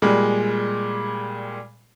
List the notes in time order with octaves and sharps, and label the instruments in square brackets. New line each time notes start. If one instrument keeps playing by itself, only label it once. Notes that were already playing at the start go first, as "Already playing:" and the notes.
[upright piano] A#2 G3 G#3